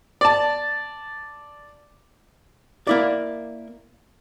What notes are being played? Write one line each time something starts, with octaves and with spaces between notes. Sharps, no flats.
D5 A5
A#3 E4 D5